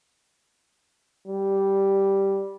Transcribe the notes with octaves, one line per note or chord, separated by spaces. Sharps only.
G3